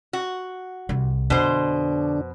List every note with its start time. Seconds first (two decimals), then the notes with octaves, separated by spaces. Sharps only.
0.13 F#4
0.89 C2
1.30 F2 B2 D3 D4 C5